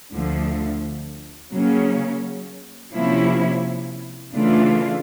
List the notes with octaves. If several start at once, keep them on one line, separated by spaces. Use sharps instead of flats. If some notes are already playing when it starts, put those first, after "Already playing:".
D2 D3 F3 A3
C#3 F#3 A#3 C#4
C3 F3 A#3 C#4 E4
C#3 E3 A3 D4 F4